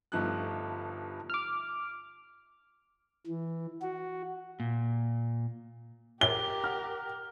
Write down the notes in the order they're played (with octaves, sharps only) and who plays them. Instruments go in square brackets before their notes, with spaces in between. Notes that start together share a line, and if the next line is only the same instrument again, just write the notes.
[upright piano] G1 G2 F3 A3 D#4 F#6
[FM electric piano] D6 F6
[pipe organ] E3
F#4
[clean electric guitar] A#2
[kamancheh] G4 A#4 [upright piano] G7
[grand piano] F#5 F6